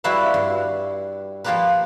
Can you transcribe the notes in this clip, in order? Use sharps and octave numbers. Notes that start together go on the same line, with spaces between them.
G3 E4 F#4 B4 E5 F5
G2
F3 A#3 F4 G4 A#4 B4